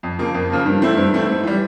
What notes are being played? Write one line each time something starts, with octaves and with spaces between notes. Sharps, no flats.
F2
C#3 F3 A#3
F2
C#3 F3 A#3
G2
E3 A3 C4 E4
G2
E3 A3 C4 E4
G#2
E3 G3